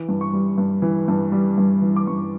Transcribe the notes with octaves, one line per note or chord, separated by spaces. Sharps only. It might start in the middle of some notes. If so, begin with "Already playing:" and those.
Already playing: E3
G2
C#6
G3
G2
E3
G2
G3
G2
E3
D6
G2 C#6